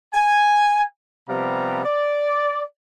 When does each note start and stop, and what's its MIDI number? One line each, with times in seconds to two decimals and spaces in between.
0.14 0.83 80
1.29 1.80 48
1.29 1.80 53
1.29 1.80 55
1.29 1.80 59
1.29 1.80 77
1.29 1.80 82
1.84 2.63 74